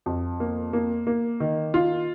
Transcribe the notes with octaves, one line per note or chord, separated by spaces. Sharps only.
F2
A#3
A#3
A#3
D#3
F4